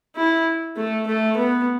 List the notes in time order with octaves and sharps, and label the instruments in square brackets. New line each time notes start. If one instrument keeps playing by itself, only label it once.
[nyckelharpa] E4
A3
A3
B3